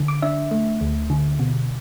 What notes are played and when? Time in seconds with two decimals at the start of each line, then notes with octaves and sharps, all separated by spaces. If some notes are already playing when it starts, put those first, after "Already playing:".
Already playing: D3
0.08 D6
0.22 D4 E5
0.51 A3
0.81 D2
1.10 D3
1.39 B2